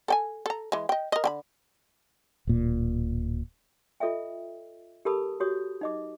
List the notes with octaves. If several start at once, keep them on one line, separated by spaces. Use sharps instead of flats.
A4 G5 G#5
A4 A#5
E3 G#3
D#5 G5
A#4 D#5
D3 G5 B5
D1 A#2
F4 A4 D#5 E5 G5
G4 A4 A#4 A5 B5 D#6
F#4 G4 C#5 D#6
D#4 D#5 D6